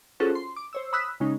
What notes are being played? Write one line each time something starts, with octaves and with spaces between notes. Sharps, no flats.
C#4 F4 F#4 G#4 A4 C5
C6
D6
C5 C#5 E6
B5 D#6 E6 F#6 B6
C#3 G#3 C#4 D#4